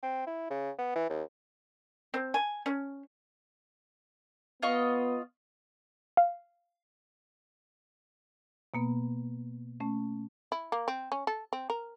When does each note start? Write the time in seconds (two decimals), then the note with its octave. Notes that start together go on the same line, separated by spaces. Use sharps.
0.03 C4
0.27 E4
0.50 C#3
0.79 B3
0.96 E3
1.10 D#2
2.14 C4
2.34 G#5
2.66 C#4
4.62 B3 F4 D#5 C#6
6.17 F5
8.74 B2 A#3 B3
9.80 A3 C#4
10.52 E4
10.72 A#3
10.88 C4
11.12 C#4
11.27 A4
11.53 C4
11.70 A#4